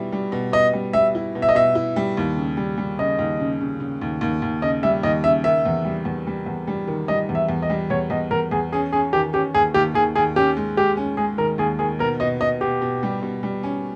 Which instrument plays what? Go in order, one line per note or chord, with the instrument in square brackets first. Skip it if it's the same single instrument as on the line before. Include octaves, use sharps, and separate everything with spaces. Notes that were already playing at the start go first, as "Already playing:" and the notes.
Already playing: [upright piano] B2 G3 E4
G3
B2
[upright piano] B2 [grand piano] D#5
[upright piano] G3
[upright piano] G3 [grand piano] E5
[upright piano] E4
B2
[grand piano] E5
D#5
[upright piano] B2 [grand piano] E5
[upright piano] E4
G3
D#2
C#3
G3
G3
[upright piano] C#3 [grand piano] D#5
[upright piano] D#2
C#3
C#3
C#3
D#2
D#2
D#2
[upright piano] C#3 [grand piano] D#5
[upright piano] G3 [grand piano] E5
[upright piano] D#2 [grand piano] D#5
[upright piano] C#3 [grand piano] E5
[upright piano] D#3 [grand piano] E5
[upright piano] E2
G3
E2
G3
E2
G3
D#3
[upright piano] G3 [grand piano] D#5
[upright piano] E2
[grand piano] E5
[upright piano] E2
[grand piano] D#5
[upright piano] G3
[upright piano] E2 [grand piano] C#5
[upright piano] E2 [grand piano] D#5
[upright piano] E2 [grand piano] A#4
[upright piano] E2 [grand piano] G#4
[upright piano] C#4 [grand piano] G#4
[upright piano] C#4 [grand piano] G#4
[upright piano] D#3 [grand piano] G4
[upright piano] C#4 [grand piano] G4
[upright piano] D#2 [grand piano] G#4
[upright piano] D#2 [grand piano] G4
[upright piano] D#2 [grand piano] G#4
[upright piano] D#2 [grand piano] G#4
[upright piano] C#4 [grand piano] G4
[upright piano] G#3
[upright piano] G#3 [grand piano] G4
[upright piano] C#4
[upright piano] G#3 [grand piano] G#4
[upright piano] D#3 [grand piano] A#4
[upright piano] D#2 [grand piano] G#4
[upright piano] D#3 [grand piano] G#4
[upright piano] B2 [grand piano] A#4
[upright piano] B2 [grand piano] D#5
[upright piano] B2 [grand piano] D#5
[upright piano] B2 [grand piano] G4
[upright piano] B2
G3
B2
G3
C#4